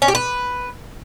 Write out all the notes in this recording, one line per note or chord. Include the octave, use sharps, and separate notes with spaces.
C#4
G4
B4